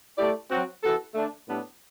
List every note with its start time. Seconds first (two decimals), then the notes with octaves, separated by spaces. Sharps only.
0.18 A3 E4 G4 D5
0.50 F#3 C4 F#4
0.82 E3 B3 F#4 A4
1.14 D3 A3 D4
1.46 A2 G3 B3 D4 A4